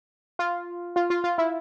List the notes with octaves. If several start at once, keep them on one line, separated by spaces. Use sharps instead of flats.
F4
F4
F4
F4
E4